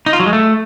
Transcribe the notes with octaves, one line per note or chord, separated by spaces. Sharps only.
D#4
F4
F#3
G#3
A3